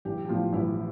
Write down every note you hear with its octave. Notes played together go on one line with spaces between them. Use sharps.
A1 G4
G4
A2 F3 F4
A1 E4